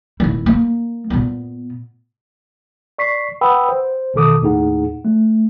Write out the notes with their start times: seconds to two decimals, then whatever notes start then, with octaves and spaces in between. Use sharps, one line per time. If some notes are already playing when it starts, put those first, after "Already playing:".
0.20 D#1 E4
0.46 A#3
1.10 A#2 B3
2.98 D5 C#6 B6 C7
3.41 B4 F#5 G5 B5 D#6 E6
3.69 C5
4.14 A1 B2 D#3 A4 D6 D#6
4.41 D#2 A2 D#4 G#4 F#5
5.05 A3